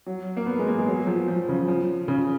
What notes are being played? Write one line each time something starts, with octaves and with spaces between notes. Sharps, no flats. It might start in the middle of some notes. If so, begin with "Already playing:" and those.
F#3
A#3
B3
G#3
A#3
G#3
F#3
F3
F3
C#3
F3
C#3